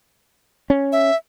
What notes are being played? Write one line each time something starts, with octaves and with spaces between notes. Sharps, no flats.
C#4
E5